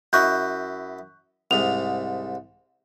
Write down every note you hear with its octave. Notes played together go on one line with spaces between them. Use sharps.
F#2 E4 D#5 C#6 F#6 G6
C2 G#2 F7